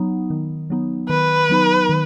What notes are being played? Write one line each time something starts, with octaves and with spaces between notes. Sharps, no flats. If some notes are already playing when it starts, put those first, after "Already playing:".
Already playing: F#3 B3 D#4
D#3
F#3 B3 D#4
D#3 B4
F#3 B3 D#4
D#3